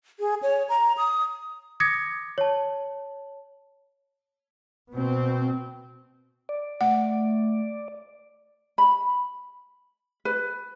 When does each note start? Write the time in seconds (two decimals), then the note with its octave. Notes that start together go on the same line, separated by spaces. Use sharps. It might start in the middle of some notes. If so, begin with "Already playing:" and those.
0.20 G#4
0.43 C#5
0.69 A#5
0.97 D#6
1.80 D6 D#6 G#6 A#6 C#7
2.38 C#5 A5
4.90 B2 C4
6.49 D5
6.81 A3 F#5
8.78 B5
10.25 B4